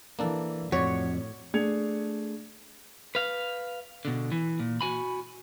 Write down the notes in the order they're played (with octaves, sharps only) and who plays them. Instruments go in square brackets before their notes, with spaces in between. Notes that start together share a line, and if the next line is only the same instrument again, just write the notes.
[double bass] E3 [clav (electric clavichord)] A#3 D4 A4
[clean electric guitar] F2 [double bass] A2 [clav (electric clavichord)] F#4 D5 [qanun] C#5
[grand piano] A3 D4 G#4 G#6 C#7 F7
[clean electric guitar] B4 F5
B2 D3
E3
A#2
F#4 G#5 B5